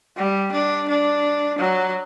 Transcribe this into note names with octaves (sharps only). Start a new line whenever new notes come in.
G3
D4
D4
F#3